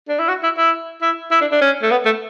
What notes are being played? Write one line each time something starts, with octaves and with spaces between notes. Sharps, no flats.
D4
E4
F#4
E4
E4
E4
E4
D4
D4
C#4
A3
B3
A3